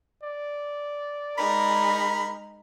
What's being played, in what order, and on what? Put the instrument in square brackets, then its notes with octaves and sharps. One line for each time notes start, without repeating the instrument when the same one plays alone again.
[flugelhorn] D5
[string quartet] G#3 D#4 G#4 [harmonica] A#4 [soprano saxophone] B5